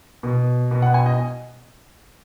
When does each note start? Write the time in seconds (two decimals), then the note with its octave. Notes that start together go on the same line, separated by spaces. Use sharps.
0.23 B2
0.71 B2
0.82 F#5
0.94 G#5
1.06 D#5